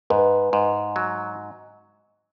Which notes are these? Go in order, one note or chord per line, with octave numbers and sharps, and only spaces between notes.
G#2 B4
G#2
F#3